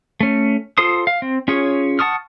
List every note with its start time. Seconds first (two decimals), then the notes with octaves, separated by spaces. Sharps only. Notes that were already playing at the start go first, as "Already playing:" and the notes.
0.21 A3 C#4
0.78 F4 A4 C5 C6 D#6
1.07 F5
1.22 C4
1.48 C#4 F4 G#4 C#5
1.99 F#5 A5 C#6 D#6 F6